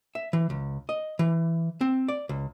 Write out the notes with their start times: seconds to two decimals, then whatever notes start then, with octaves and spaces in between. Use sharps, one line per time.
0.15 E5
0.33 E3
0.50 C#2
0.89 D#5
1.19 E3
1.81 C4
2.08 D5
2.29 C#2